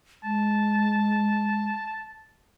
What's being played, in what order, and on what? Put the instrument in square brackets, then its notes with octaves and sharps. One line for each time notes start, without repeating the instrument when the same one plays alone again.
[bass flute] G#3 [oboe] A5